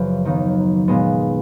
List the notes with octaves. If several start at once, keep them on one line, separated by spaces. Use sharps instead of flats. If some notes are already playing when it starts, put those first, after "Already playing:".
Already playing: F#1 F#2 C#3 F3 B4
D#2 D#3 F#3 B3 D#4
A#2 G#3 B3